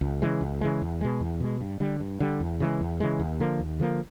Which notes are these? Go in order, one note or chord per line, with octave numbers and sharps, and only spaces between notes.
C#2
C#3 E3 G#3
C#2
C#3 E3 G#3
E2
B2 G#3
E2
B2 G#3
G2
D3 G3
G2
D3 G3
E2
C#3 E3 G#3
E2
C#3 E3 G#3
D#2
D3 F3 A#3
D#2
D3 F3 A#3